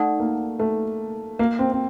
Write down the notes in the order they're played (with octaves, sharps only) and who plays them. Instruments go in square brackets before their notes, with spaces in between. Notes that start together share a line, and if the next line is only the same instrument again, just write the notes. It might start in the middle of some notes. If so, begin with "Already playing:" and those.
Already playing: [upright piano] A3 [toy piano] D#4 A4 D5 F#5
[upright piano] A#3
A3
A#3
C4
C4